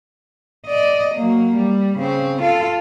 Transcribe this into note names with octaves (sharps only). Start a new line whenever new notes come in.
D5 D#5
F#3 A#3
G3
C#3 C4
F4 A4